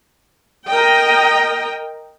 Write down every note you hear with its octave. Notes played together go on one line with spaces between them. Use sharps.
A#4 D#5 G5